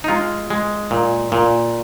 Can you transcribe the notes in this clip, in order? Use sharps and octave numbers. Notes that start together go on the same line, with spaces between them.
D#4
G#3 F4
G#3
A#2
A#2